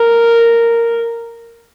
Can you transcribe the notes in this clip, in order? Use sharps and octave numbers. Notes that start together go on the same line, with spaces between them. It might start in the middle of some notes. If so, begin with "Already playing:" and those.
Already playing: A#4